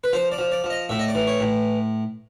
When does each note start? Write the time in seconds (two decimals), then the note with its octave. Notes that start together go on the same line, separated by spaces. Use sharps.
0.04 B4
0.13 F3 C5
0.32 D5
0.38 F3
0.52 D5
0.64 F3
0.70 D#5
0.89 A2 E5
0.99 D#5
1.08 D5
1.15 E3
1.27 C#5
1.40 A2